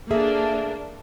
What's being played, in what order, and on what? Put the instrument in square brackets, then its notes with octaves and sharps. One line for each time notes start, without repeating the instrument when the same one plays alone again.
[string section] A#3 D4 [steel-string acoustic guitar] G#4 A4 E5